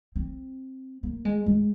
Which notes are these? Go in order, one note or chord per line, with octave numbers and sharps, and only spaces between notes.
C4
A#3
G#3
G#3